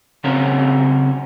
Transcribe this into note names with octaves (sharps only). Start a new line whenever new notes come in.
C#3 C4 C#4 F#4 A#4